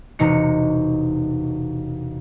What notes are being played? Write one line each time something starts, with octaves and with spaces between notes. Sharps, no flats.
E1 C3 D#4 C#7